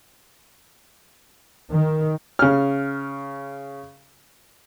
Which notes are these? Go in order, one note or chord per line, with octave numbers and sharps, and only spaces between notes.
D#3
C#3 F6